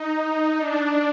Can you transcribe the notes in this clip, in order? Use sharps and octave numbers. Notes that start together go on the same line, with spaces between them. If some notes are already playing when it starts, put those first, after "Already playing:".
Already playing: D#4
D#4
D4